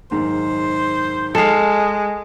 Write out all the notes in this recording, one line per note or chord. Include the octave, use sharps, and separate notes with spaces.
F#1 G#2 D#3 C5
G#3 A4 F5